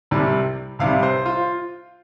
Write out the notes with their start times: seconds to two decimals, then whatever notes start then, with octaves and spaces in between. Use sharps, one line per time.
0.11 C2 C3 G3
0.79 C2 C3 G3 F5
1.03 C5
1.26 F4